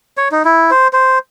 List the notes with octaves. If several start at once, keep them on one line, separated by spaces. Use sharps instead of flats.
C#5
D#4
E4
C5
C5